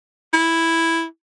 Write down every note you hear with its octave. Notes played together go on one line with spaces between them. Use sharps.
E4